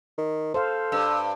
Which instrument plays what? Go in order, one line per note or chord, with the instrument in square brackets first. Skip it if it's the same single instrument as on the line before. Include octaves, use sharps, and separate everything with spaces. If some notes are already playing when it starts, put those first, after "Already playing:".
[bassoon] D#3
[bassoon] A4 [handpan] C5 F5
[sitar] G2 [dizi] E6